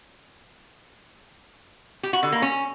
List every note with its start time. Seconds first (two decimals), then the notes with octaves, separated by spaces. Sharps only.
2.03 G4
2.13 F#4
2.23 D3
2.32 A#3
2.42 C#4